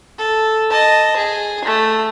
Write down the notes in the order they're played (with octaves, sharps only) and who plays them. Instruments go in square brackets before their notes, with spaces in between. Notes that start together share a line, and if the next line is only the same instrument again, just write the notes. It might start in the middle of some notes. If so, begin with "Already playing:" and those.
[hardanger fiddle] A4
D#5 A5
G#4
A3